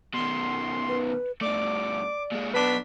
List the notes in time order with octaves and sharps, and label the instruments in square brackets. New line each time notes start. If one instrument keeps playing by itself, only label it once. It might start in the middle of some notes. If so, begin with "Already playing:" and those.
[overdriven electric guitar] B2 D#3 [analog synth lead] C6
[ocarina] B4
[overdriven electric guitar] G2 A3 [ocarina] D5 [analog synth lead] D6
[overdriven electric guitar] A#2 G#3
[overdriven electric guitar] B1 B2 [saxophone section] D4 B4 [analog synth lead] B6